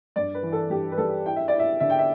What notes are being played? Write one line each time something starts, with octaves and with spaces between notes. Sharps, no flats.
G2 D5
B4
E3
A4
G2 G4
B4
G3 A4
E4 G5
E5
D5
E4
E5
D3 E5
G5
E5